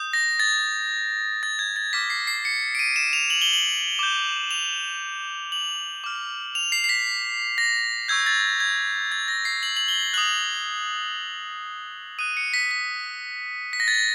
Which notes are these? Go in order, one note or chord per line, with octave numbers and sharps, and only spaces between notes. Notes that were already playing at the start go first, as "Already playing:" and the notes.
Already playing: D#6 G6
A#6
A6
A6
G#6
A6
D6 F6 B6
C7
C7
C#7
D7
D#7
E7
F7
F#7
G7
F#7
D6 G6
F7
F#7
D6 F6
F7
C7
C7
B6
A#6
C#6 E6 G6 G#6
A6
G#6
A6
A#6
C7
F#7
F#7
G7
D#6 F#6 F#7
D#6 F#6 D#7
C#7
B6
B6
B6
A#6
A6
A#6